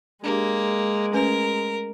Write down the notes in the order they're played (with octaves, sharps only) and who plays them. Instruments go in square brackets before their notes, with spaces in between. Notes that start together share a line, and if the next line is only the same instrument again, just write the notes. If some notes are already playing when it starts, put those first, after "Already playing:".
[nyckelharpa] G#3 [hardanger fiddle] A#3 [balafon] D4 G4
[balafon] A3 C#4 B4 [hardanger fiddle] A#4